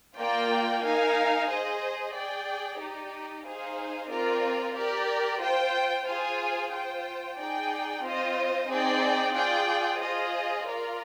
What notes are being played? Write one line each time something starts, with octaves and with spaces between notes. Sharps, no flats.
A#3 F4 A#4 D5 G5
D#4 A#4 F5 G#5
G#4 C5 D#5
G#4 D5 G5
D#4 G4 D5
D#4 G#4 C5 F5
C4 F4 A#4 D5
G4 A#4 D5
F4 C5 G5
F4 G#4 C5 F5 G#5
F4 C5 G5
D#4 G#4 D5 G5
C4 F4 C5 D#5
C4 D#4 G#4 D5 G5
F4 G#4 D5 G5
F4 G#4 C5 D#5
F4 A#4 D5